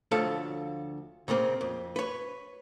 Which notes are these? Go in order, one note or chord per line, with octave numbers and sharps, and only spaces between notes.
D2 F3 A4 C#5 F5 A5
A#2 C#3 A#3 C4
F2
B4 C#5